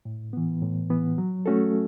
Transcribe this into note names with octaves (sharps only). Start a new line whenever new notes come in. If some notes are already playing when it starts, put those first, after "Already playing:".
A2
E3 B3
A2
E3 B3
F#3
A3 C#4 F#4 A4